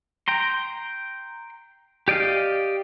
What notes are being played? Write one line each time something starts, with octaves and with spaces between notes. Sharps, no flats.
G5 A#5 C6
G4 D5 D#5 F5